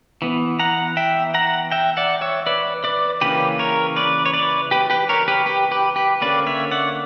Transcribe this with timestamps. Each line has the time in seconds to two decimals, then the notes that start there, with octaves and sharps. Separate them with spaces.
0.22 E3 B3
0.59 F#5 A#5
0.97 E5 G5
1.34 F#5 A#5
1.72 E5 G5
1.97 D5 F#5
2.21 C#5 E5
2.46 B4 D5
2.84 B4 D5
3.21 C#3 E3 A#3 C#4 G4 B4
3.59 A#4 C#5
3.96 B4 D5
4.26 C#5
4.33 B4 D5
4.71 G4 B4
4.90 G4 B4
5.09 A#4 C#5
5.28 G4 B4
5.46 G4 B4
5.71 G4 B4
5.96 G4 B4
6.21 D3 A#3 C#4 B4 D5
6.47 C#5 E5
6.71 D5 F#5